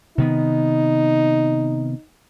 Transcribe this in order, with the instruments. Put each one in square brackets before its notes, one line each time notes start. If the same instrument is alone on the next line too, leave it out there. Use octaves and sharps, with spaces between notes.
[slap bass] C3 D#3 B3 [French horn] D#4